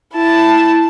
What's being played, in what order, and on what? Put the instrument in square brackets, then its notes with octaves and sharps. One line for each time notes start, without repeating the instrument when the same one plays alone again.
[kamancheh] E4 A5